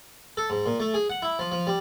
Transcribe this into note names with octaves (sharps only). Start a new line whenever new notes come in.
A4
G#2
A#2
A3
G#4
F#5
E4
F3
F3
G3